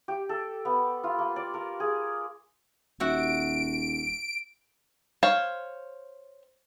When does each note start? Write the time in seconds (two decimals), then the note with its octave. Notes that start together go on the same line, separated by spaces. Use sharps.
0.08 G4
0.29 A4
0.65 B3
1.04 F4
1.19 A#3
1.36 D5
1.54 A#4
1.80 G#4
3.00 D#1 F#4 E5 F#5 D7
5.23 C5 C#5 F5